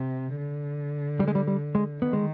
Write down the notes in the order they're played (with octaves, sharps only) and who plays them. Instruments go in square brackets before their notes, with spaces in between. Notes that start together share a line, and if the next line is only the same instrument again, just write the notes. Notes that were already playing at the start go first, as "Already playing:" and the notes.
Already playing: [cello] C3
D3
[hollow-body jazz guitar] G3
G#3
G3
G3
G#3
[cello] D#3 [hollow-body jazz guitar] B3
[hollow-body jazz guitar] G#3